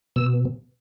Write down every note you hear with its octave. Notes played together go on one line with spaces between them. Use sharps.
B2 E6